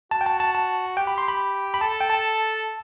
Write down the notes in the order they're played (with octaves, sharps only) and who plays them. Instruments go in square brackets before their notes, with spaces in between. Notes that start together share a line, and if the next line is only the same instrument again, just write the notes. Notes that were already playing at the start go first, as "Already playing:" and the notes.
[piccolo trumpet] F#4 [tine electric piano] A5
[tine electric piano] G5
A5
A5
A5
[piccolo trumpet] G4 [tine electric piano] G5
[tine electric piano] B5
C6
B5
B5
[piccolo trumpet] A4 [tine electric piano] A5
[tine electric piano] G5
A5